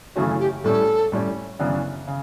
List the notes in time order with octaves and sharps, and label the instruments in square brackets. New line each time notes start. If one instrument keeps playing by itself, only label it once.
[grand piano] F#2 C#3 E3 A3 C#4 [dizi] F#4
[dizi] G4
[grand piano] A2 G3 C#4 [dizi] A4
[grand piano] A2 G3 C#4
F#2 C#3 E3 B3 D4
C#3